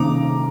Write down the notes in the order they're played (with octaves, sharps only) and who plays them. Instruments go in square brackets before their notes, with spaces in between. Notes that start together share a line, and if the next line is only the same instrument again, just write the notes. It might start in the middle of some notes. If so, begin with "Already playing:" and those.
Already playing: [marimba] C3 D#3 A#3 D#4 [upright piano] A#5 D6